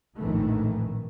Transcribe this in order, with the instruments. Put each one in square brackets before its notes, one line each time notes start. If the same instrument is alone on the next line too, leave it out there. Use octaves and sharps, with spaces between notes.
[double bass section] A#1 F2 A2 D#3 E3 A3